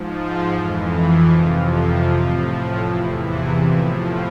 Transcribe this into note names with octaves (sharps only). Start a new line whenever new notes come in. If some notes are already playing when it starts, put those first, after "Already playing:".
Already playing: G#2 F3
F4
F2 E3
G#4
F2 C3 F3 F4
F4
A2 F3 F4
E4
E2 C3 E3 E4
E4
A2 F3 E4